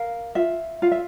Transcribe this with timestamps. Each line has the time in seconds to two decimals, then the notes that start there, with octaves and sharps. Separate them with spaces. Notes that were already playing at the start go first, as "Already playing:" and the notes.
Already playing: A#4 F5
0.35 F4 E5
0.82 F4 F5
0.92 E5